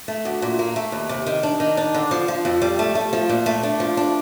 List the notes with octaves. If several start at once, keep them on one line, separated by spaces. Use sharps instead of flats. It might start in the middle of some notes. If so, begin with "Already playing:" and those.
A3
D2
A#2
A#3
A3
D#2
C3
D#3
D4
D#3
D4
D3
F3
F3
F2
G3
A3
A3
F3
A#2
A3
D4
F3
D4